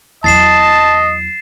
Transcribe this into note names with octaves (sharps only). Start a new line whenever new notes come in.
E2 F#3 D#5 A5 A6 C7 E7